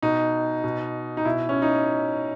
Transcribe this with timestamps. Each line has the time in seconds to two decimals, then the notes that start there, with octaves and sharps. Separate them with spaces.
0.02 B2 D#4
0.64 B2
1.17 D#4
1.25 B2 E4
1.49 C#4
1.62 D#4